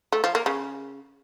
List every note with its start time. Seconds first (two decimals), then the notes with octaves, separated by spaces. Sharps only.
0.12 A3
0.24 F3
0.35 A#3
0.46 C#3